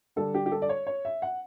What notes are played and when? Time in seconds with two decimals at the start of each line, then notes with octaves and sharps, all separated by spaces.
0.16 D3 G3 D4 A4
0.34 G4
0.46 G4
0.52 A4
0.62 D5
0.69 C#5
0.87 C#5
1.05 E5
1.22 F#5